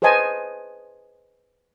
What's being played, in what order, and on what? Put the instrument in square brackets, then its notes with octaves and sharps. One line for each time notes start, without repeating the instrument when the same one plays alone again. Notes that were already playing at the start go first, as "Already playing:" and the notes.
[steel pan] G#4 B4 C5 D#5 G#5 A5